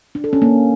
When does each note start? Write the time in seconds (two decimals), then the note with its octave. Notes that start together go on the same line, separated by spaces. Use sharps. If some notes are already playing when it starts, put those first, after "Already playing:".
0.15 D4
0.24 A4
0.33 C#4
0.42 A#3